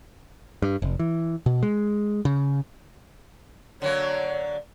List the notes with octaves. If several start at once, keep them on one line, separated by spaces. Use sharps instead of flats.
G2
F1
E3
B2
G#3
C#3
D3 F#3 A#3 C#5